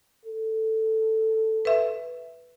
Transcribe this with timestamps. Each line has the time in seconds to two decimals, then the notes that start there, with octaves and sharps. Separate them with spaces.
0.26 A4
1.65 B4 E5